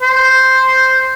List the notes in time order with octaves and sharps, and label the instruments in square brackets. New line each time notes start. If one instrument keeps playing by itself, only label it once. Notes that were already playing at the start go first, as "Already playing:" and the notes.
[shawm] C5